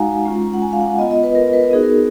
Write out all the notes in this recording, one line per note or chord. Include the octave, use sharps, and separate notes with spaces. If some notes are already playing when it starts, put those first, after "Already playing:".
Already playing: G#3 D#4 F#4 F5 F#5 G#5 A#5
G#3 C#4 F4
F#5
G#5
F5
F#5
B3 F4 D#5
D#5
B4
A#4
B4
A#4
B3 D#4 F#4 G#4
A#4